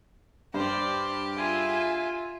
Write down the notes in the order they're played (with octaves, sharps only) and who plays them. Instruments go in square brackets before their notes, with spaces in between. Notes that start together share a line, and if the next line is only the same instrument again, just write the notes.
[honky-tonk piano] G2 [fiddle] G4 [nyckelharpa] C5 D5
[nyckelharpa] F4 G#4 [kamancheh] E5 G#5